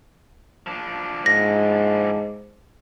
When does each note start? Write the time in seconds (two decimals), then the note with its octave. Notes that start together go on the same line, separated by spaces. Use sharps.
0.67 F3 D4
1.26 G#2 A#6